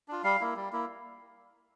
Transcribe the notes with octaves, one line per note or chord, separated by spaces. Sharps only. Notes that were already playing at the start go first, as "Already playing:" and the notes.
D4 F4
G3 F5
A#3 E4
G3
A#3 E4